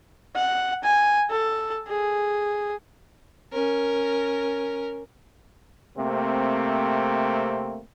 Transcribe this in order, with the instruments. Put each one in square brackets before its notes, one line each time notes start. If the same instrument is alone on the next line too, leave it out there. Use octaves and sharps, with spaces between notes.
[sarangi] F#5
G#5
A4
G#4
[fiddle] C#4 A#4
[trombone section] C3 A3 A#3 C4